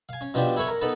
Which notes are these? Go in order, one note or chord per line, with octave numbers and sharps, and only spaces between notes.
F5 G#5
C#4
B2 F3 D4 G4 A5
E4 A4 B4 C#5
A#4
B3 D#4 A4 B4 A5